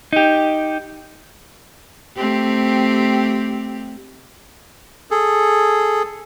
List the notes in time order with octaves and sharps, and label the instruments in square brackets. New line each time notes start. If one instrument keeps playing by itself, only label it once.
[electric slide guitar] D#4 G4
[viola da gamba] A3 C4 G4
[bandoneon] G#4 A4